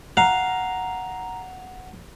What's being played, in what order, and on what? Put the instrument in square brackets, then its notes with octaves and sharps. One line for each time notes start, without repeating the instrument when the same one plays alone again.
[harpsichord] F5 [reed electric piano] F#5 [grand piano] A#5